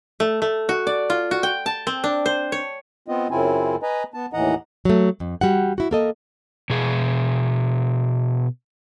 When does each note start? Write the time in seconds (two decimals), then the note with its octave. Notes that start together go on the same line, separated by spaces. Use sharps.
0.20 A3
0.42 A3
0.69 F#4
0.87 D5
1.10 F4
1.31 F#4
1.43 G5
1.66 A5
1.87 C4
2.04 D4
2.26 C5
2.52 C#5
3.08 B3 C4 F4 D#5
3.31 F#2 C#3 C4 E4 F4 G#5
3.83 B4 D#5 G#5 A#5
4.14 B3 A5
4.33 D#2 A2 E3 D#5 F#5 A#5
4.85 F#3 A3
5.20 F2
5.41 G3 F#4 F#5
5.78 E4 F#4
5.91 A#3 A4 D#5
6.70 B2 G#4